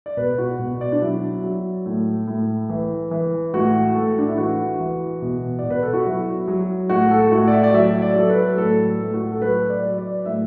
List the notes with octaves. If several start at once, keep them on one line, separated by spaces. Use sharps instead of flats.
D5
B2 B4
F#4
B2
D5
D4
F#3 E4
F#3
A2
A2
E3
E3
A2 F#4
A2 A4
D4
E4
E3 F#4
E3
B2
D5
B2
B4
A4
F#4
F#3 E4
F#3
A2 F#4
A4
A2 F#4
D5
E5
D5
F#3 E5
D5
F#3 A4
B4
A2 A4
A2
F#4
A4
F#3 B4
D5
F#3
D5
A2 E5